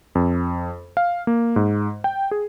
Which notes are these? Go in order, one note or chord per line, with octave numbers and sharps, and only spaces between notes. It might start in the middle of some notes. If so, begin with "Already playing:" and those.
F2
F5
A#3
G#2
G5
G#4